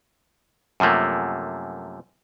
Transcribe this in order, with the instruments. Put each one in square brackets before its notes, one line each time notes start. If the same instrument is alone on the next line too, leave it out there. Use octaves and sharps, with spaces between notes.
[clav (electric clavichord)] F#2 C3 F3 A3 A#3